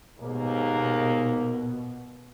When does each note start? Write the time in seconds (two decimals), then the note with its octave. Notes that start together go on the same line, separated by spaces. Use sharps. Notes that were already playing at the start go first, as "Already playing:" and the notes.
0.19 D#2 G#2 B2 A#3